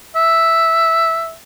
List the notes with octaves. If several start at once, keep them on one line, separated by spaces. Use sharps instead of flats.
E5